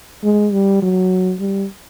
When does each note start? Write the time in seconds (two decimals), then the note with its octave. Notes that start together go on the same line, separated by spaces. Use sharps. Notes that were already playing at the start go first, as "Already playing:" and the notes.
0.24 G#3
0.53 G3
0.83 F#3
1.40 G3